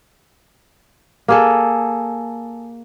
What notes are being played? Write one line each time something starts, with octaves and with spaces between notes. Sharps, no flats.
A#3 G#4 A4